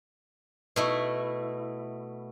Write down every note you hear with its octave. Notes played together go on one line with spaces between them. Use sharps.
B2 A3 E4